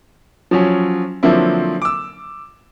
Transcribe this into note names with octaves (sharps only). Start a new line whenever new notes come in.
F3 F#3 C#4
D3 F3 F#3 A#3 C4 E4
D6 E6